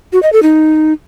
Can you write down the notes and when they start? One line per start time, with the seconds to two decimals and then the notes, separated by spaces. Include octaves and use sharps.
0.13 F#4
0.23 D#5
0.33 A4
0.43 D#4